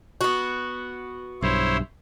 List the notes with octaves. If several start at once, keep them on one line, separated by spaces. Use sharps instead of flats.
B3 F#4
B1 G2 E4 C5 C#5